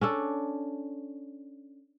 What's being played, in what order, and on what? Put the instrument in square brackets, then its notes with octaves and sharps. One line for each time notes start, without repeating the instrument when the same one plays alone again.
[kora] C#4 D4 A4